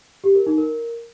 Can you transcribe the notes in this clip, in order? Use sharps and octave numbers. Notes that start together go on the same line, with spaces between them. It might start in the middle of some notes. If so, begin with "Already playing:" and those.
G4
A#4
D#4
A#4